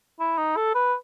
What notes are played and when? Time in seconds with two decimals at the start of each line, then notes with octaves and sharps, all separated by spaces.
0.20 E4
0.38 D#4
0.57 A4
0.75 B4